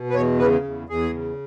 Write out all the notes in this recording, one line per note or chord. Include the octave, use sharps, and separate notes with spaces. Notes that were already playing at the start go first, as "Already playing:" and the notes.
Already playing: B2
B4
E2 C#5
C#3 B4
E2
E2 G#4
C#3